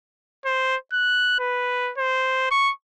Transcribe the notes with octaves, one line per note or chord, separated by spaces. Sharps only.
C5
F#6
B4
C5
C#6